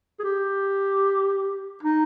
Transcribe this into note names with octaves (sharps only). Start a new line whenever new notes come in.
G#4
G4
D#4